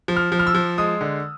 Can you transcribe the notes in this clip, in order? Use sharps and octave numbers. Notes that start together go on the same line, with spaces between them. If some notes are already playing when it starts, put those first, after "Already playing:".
F3
F6
F3
F6
E6
F3
G#3 D#6
D3